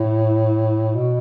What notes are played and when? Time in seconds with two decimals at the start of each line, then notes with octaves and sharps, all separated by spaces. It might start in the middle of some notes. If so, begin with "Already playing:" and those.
Already playing: A2
0.95 B2